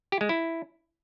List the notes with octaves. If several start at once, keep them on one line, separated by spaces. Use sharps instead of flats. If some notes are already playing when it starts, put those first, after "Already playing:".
G4
G#3
E4